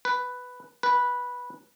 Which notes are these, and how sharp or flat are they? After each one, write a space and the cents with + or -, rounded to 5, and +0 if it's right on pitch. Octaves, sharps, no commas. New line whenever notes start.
B4 +5
B4 -10